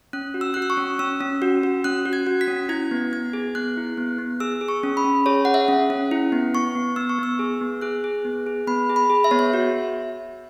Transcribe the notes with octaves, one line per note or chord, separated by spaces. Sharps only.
C#4 F#6
F#4
E6
F#4 F#6
E6
C#6
C#4
C#4 E6
C#4
F#4
F#4
C#4 F#6
F#4
G#6
F#4
B6
C#4
E4 G#6
B3
B3 G#6
G#4
B3 F#6
E4
B3
B3
G#4 E6
G#4
C#6
C#4
B5
C#4
G#4 C#5
G#4 F#5
E5
C#4
C#4
E4
B3
B3 C#6
B3
B3 E6
C#6
B3 E6
G#4
B3
G#4 F#6
G#4
B3
G#4
B3 B5
G#4
B5
G#4
E5
B3 C#5
E5
F#4